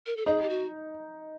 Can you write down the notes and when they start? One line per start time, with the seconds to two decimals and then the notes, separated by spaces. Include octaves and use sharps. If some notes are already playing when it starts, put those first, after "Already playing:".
0.06 A#4
0.17 A4
0.26 D#4 G#4
0.42 G4
0.49 F#4